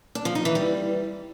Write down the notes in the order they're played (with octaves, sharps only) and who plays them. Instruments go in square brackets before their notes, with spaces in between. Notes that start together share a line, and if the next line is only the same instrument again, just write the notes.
[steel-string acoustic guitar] D4
F3
D#4
E3
G3